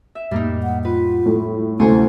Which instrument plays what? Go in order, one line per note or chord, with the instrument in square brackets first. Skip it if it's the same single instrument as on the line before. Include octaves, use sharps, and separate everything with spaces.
[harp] E5
[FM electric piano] F2 A2 [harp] G3 A#3 D#4
[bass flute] F#5
[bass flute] F4 [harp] B4
[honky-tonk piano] A2
[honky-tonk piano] D2 [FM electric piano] C3 A3 C#4 [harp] F#3 C5 G#5 [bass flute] E4